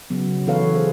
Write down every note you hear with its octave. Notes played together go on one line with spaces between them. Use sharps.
C#3 F#3 B3
E3 B3 A4 B4 C#5 F5
B3 G#4 C5